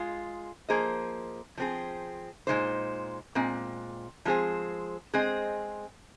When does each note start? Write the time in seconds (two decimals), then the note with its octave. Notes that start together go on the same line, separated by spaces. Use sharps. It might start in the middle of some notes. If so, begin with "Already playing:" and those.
Already playing: G#3 F4 G#4
0.69 F3 A#3 G#4 C5 D#5
1.58 F3 C4 G#4
2.47 A#2 F3 G#3 D#4 C5
3.35 A#2 G#3 C4
4.25 F3 G#3 C4 G#4 C5
5.14 G#3 C4 G#4 C5 D#5